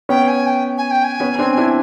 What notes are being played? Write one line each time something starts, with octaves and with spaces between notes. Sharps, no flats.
B3 C#4 G5
G#5
G5
G#5
G5
G#5
B3 C#4
C4 D4
D4 E4